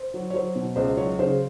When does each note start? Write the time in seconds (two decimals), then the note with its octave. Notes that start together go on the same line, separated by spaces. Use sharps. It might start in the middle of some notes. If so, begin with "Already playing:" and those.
Already playing: C5
0.14 F#3
0.30 C#5
0.34 F#3 C5
0.55 B2
0.76 C#2 C5
0.97 F#3 C#5
1.19 C#3 C5